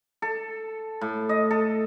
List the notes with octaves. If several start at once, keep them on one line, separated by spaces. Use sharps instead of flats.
A4
A2
D#5
A4